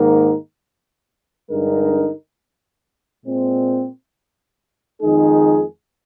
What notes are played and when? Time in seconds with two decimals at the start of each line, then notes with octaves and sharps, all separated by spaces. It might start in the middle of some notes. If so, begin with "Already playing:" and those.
Already playing: G#2 D#3 A#3 D#4 A#4
1.49 G2 D3 G#3 D#4 A#4
3.26 A#2 G#3 C4
5.01 F2 D#3 G#3 D#4 G#4